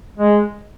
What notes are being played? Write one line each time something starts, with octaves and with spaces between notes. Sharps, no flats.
G#3